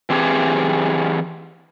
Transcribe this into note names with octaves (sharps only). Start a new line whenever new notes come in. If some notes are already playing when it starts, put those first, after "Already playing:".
E3 C4 G4 G#4